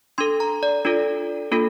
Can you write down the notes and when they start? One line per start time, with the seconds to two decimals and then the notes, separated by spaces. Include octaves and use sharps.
0.18 D4 A4 C6
0.40 A#5
0.63 D5
0.85 D4 F4 A4
1.52 A#3 D4 F4 A4